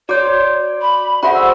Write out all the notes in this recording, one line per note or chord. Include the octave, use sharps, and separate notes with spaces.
F#4 C#5 D5 C6 D6 G6
B5
F#4 G#4 C5 E5 F#5 B5
E6